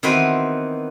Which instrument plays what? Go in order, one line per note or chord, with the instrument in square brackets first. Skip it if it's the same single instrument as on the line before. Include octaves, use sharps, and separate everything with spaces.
[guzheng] D#3 E3 B3 C4 F#4 B4